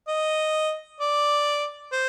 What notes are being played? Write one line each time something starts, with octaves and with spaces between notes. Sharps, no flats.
D#5
D5
C5